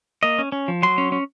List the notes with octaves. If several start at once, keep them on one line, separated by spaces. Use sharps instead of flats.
A#3 D#5
C#4
C#4
F3
F#3 C6
C#4
C#4